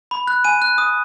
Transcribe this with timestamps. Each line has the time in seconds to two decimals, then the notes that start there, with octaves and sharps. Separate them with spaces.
0.11 B5
0.27 F#6
0.44 G#5 D#7
0.62 F#6
0.78 D#6